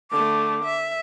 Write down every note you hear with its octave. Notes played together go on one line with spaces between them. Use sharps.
D3 A3 D6
E5